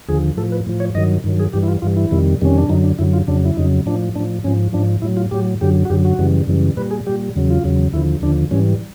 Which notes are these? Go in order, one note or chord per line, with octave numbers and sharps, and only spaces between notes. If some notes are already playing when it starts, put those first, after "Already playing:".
D#2 D3 F3 G#4
A2 F3 A4
B4
A2 F3
C#5
G2 D#3 F#3 D#5
G2 D#3 F#3
G#4
G2 E3 G3 G4
E4
F4
G2 E3 G3 F4
E4
F2 C3 D#3 G3
F2 C3 D#3 G3 C#4
D4
F#2 D3 F#3 D#4
D4
F#2 D3 F#3 E4
F4
F2 C#3 F#3 D4
E4
F2 C#3 F#3 D#4
A2 F3 D4
A2 F3 D4
G#2 F3 C#4
G#2 F3 D4
A2 F#3 E4
F4
A2 F#3 G4
F#2 D3 F#3 G4
F#4
F#2 D3 F#3 G4
F#4
F#2 C#3 E3 G3
F#2 C#3 E3 G3
A#2 G3 B4
G#4
A#2 G3 G4
E2 C#3 F#3
F4
E2 C#3 F#3
D#2 D3 F3 E4
D#2 D3 F3 D4
G#2 E3 G3 C#4